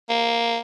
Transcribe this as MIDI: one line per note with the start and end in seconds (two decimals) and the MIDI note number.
0.09 0.59 58